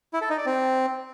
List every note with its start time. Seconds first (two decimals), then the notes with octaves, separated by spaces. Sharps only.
0.13 E4
0.21 A4
0.30 D#4
0.38 D5
0.46 C4